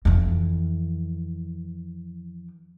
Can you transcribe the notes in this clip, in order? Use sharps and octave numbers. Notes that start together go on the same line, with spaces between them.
F2 E3